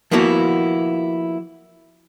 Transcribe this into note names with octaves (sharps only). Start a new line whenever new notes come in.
F3 A#3 B3 E4 F#4